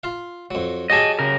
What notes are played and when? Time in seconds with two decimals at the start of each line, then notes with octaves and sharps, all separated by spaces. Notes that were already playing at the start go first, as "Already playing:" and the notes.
0.04 F4 F5
0.51 F2 F#3
0.90 F#3 G4 G#4 D#5 A5
1.19 C#3 A#4